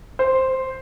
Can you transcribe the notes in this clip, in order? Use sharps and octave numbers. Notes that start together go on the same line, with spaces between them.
C5